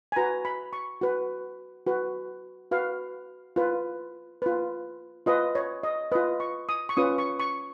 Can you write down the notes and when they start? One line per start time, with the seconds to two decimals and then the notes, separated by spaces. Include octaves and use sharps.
0.12 G#5
0.16 F#4 B4 A#5
0.45 B5
0.73 C#6
1.01 F#4 B4
1.87 F#4 B4
2.71 F#4 B4 F5
3.56 F4 B4
4.42 F4 B4
5.26 F4 B4 D#5
5.55 C#5
5.83 D#5
6.12 F4 B4 D#5
6.40 C#6
6.69 D#6
6.89 C#6
6.97 C#4 F4 B4 D#6
7.18 C#6
7.40 C#6